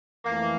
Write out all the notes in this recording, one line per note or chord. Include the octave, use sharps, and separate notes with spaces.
F2 E3 A3 A#3